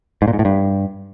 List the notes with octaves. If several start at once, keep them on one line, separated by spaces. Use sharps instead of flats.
G#2
A#2
G#2
A2
G2